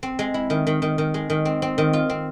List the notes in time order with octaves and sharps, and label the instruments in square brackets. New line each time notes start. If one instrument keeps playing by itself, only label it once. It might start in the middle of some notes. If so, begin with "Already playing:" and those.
[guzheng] C4
G#3
E4
D#3
D#3
D#3
D#3
G#3
D#3
C4
C4
D#3
F4
C4